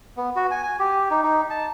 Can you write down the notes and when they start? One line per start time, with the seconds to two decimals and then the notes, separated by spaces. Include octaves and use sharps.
0.17 B3
0.36 F#4
0.51 G#5
0.63 G#5
0.79 G4
1.10 D#4
1.23 D#4
1.50 A5